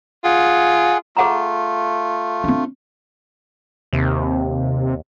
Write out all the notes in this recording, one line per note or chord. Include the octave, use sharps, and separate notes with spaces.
F4 G#4 F#5 G#5
A3 F4 G#4 F#5 A#5
C4 D4
D#2 C3